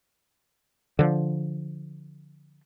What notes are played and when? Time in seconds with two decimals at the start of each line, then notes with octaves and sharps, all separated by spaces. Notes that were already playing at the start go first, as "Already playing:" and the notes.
0.99 D3 F3